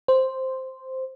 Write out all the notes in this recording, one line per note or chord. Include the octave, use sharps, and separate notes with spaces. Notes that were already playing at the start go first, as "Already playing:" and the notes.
C5